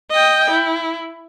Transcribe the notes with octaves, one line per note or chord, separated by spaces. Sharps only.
D#5 G5
E4